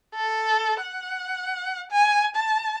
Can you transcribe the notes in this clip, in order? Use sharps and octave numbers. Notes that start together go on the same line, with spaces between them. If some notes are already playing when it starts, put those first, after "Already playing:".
A4
F#5
G#5
A5